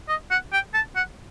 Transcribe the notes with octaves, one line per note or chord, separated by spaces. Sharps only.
D#5
F#5
G5
A5
F#5